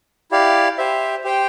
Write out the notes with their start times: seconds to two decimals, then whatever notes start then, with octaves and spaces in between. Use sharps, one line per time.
0.31 E4 G4 D5 F5
0.78 G4 C5 E5
1.24 G4 C5 G5